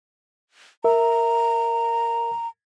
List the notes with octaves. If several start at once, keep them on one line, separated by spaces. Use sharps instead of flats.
A#4 E5 A#5